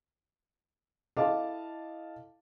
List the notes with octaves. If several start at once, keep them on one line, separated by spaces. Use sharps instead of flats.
E4 A4 D#5 F5 A5 D6